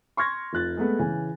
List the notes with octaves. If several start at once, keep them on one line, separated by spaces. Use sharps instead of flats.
C6 C#6 F6 G#6 A#6
F1 F4 F#6 A6
G#3 A3 B3
C#3 E3 G#5